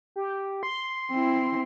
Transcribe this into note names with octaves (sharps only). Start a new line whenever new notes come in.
G4
C6
C4 E4